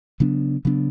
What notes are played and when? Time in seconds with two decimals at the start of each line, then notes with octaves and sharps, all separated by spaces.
0.20 C#3 F#3 B3 D4
0.65 C#3 F#3 B3 D4